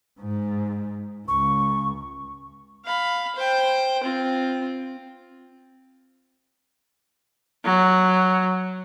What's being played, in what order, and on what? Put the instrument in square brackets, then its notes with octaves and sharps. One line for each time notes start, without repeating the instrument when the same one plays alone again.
[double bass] G#2
[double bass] C#2 [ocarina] C#6
[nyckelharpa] F5 B5
C5 G5
C4 F4
[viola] F#3